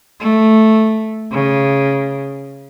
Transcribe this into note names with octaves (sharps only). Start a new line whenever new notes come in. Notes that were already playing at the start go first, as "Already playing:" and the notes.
A3
C#3